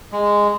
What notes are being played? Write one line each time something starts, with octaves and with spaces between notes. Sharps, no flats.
G#3